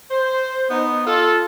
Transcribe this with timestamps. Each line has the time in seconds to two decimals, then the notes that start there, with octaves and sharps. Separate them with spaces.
0.11 C5
0.69 B3 D#4
1.06 F4 A4